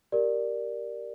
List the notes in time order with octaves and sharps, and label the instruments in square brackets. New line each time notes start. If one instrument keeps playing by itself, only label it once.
[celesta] G4 A#4 D5